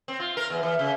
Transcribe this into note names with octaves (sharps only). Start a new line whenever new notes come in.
C4
F4
A#4
E2
E3
C#3